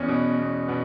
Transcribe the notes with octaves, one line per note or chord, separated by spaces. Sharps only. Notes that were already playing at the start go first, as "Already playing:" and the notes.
Already playing: E2 C#4
B2
E2
B2 B3